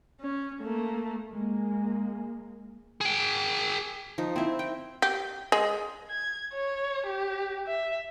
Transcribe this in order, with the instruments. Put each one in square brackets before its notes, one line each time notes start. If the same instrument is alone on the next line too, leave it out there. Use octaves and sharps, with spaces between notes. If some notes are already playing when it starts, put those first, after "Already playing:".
[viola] C#4
A3 A#3
[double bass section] G#3 A#3
[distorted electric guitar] G#4 G5
[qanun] F3 D#4
C4 E4 E5
G5
[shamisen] G4
G#3
[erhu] G#6
C#5
G4
E5